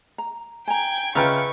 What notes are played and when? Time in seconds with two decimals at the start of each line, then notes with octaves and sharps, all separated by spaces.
0.18 A#5
0.68 G5 G#5 A#5 G#6
1.15 C#3 F4 B4 D#5 E5 G5 A#5 C#6